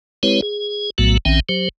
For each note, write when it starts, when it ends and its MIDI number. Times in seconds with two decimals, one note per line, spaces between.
0.23 0.41 56
0.23 0.41 60
0.23 0.41 64
0.23 0.41 67
0.23 0.41 71
0.23 0.41 73
0.42 0.90 68
0.98 1.17 34
0.98 1.17 45
0.98 1.17 54
0.98 1.17 57
0.98 1.17 59
0.98 1.17 66
1.25 1.40 34
1.25 1.40 51
1.25 1.40 60
1.25 1.40 61
1.25 1.40 76
1.25 1.40 79
1.49 1.69 54
1.49 1.69 67
1.49 1.69 72